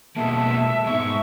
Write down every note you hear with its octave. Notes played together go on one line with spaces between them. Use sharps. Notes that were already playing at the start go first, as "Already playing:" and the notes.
B2 G#3 A#3 E5 A5
G#2 G#3 B3 E5 C#6